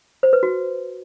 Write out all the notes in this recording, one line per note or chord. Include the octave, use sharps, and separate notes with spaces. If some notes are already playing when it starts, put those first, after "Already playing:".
C5
B4
F#4